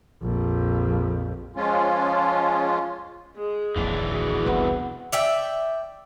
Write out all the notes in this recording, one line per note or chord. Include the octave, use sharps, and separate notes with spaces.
A#1 F2
F3 G#3 C#4 F4
G#3 G#4
D#1 A#1 F2 E3 D4
F#4 G#4
F1 C2 F2 B3
D5 E5 G5